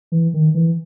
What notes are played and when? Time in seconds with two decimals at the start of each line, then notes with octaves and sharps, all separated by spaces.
0.12 E3
0.34 D#3
0.55 E3